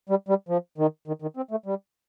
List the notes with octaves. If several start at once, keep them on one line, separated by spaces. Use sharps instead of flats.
G3
G3
F3
D#3
D#3
D#3
C4
A3
G3